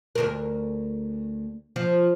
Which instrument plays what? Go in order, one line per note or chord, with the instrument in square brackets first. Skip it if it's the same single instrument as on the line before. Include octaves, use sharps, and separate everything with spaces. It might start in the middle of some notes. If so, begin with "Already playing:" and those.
[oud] D2 G#2 A#4
F3